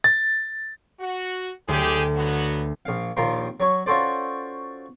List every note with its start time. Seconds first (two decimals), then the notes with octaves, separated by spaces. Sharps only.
0.04 A6
1.00 F#4
1.68 D2 G4 G#4
2.15 F#3 B3 F#4
2.85 A#1 F5
3.17 A#1 D#2 F4 A#4 C6
3.60 F#3 C#5
3.86 C#4 F4 F#4 A4 C5 D5